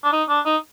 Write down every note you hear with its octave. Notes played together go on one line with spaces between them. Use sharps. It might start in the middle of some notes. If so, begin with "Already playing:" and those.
D4
D#4
D4
D#4